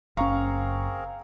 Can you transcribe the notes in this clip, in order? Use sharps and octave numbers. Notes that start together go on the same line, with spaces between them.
F#1 C4 C#4 G#4 A#4 F5 A#5 C#6